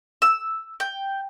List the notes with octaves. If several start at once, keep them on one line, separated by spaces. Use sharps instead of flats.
E6
G5